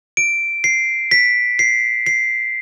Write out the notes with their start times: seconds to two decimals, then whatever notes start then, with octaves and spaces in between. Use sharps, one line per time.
0.17 D7
0.64 C7
1.11 B6
1.59 C7
2.06 C7